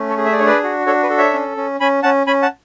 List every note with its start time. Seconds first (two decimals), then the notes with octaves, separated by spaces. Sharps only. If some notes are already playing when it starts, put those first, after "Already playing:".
Already playing: A3 C#4
0.09 A4 C#5
0.17 G#4
0.25 E5
0.32 D5
0.39 D4 C#5
0.46 B4 D5
0.63 F#4
0.87 D4 A4 C#5
1.03 B4
1.10 A4
1.18 C#5 E5
1.34 C#4
1.57 C#4
1.80 C#4 G#5 B5
2.03 C#4 F#5 A5
2.27 C#4 G#5 B5
2.42 F#5 A5